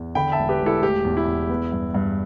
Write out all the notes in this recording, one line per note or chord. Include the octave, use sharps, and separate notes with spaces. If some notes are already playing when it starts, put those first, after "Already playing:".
Already playing: E2
D3 G5 B5
E5 A5
E1
G4 B4
E1
E4 A4
A3 G4
E2
E4
E2
B3
G2
G2